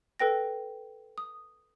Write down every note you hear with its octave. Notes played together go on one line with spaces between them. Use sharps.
A4 B4 G5 A#6
D#6